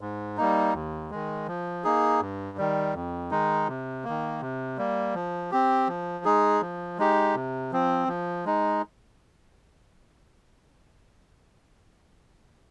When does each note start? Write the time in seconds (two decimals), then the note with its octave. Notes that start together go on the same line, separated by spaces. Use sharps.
0.01 G#2
0.37 G3 A#3 D#4
0.74 D#2
1.10 D#3 G#3
1.48 F3
1.84 A#3 D#4 G#4
2.21 G2
2.58 D#3 G3
2.94 F2
3.31 D#3 G#3 D#4
3.68 C3
4.04 D#3 A#3
4.41 C3
4.78 G3 A#3
5.14 F3
5.51 C4 G4
5.88 F3
6.25 G#3 D#4 G#4
6.61 F3
6.98 G#3 D#4 G4
7.35 C3
7.72 F3 C4
8.08 F3
8.45 G#3 D#4